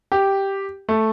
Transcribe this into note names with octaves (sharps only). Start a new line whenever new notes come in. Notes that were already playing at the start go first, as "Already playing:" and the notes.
G4
A3